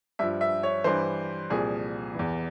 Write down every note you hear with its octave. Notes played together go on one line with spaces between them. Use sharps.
G2 F3 E5
E5
C#5
G2 E3 C5
C2 A#2 F3 G#4
E2 E3